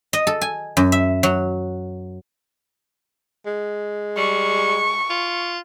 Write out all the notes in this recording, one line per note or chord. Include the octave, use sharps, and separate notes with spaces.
D#5
A4
G#5
F#2
E5
F#3
G#3
G3 C#6
F4